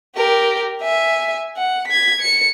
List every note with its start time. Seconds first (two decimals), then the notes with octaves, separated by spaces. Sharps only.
0.16 G4 A#4
0.83 E5 G#5
1.57 F#5
1.88 G#6 B6
2.21 C#7